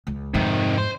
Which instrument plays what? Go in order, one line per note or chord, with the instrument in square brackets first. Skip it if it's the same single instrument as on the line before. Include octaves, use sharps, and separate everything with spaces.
[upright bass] C#2
[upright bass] F2 G#2 [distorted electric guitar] C3 D#3
[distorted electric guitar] C5